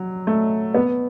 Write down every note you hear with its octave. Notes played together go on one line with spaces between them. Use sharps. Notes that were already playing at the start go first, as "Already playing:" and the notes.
Already playing: F#3
A3
B3